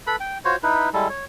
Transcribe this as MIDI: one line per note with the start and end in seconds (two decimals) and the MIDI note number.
0.07 0.16 69
0.07 0.16 71
0.07 0.16 83
0.20 0.38 79
0.45 0.56 65
0.45 0.56 66
0.45 0.56 72
0.45 0.56 73
0.63 0.89 63
0.63 0.89 64
0.63 0.89 71
0.93 1.08 55
0.93 1.08 56
0.93 1.08 64
0.93 1.08 69
1.09 1.25 73